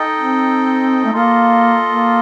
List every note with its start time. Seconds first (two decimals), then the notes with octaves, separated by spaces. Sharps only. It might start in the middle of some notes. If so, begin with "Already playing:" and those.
Already playing: D#4 A4 D#5 G5
0.16 C4
1.05 A3
1.13 A#3 F4 A4 D#5
1.86 A#3